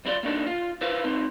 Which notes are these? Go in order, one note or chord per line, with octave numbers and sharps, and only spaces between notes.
F#2 C4 E4 F4 D5 C6
A#3 B3 D4 D#4 A4
F4
E4 B4 C5 F5
C#2 C4 D#4